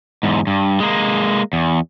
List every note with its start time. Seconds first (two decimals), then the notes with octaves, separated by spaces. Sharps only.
0.23 E2 G#2
0.47 G2
0.80 G#3 A#3
1.53 E2